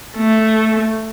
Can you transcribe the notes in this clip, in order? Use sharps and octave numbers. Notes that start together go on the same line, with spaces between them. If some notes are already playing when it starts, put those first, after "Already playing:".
A3